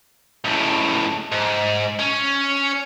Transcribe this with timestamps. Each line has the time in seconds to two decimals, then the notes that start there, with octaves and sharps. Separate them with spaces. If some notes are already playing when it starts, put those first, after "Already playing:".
0.45 C#2 A2
1.32 G#2
1.99 C#4